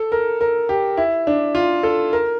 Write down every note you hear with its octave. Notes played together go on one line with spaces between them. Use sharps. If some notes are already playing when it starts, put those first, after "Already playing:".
Already playing: A4
A#4
A#4
G4
E4
D4
F4
A4
A#4